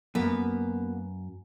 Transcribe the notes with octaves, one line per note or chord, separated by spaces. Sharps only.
F#2 A#3 B3 B4